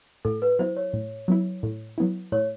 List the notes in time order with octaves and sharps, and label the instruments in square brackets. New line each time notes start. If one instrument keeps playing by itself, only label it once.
[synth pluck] A2 [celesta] A4
[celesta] B4
[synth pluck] F#3 B3 E4 [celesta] C5
[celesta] C#5
[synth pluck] A2
F#3 B3 E4
A2
F#3 B3 E4
[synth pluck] A2 [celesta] C#5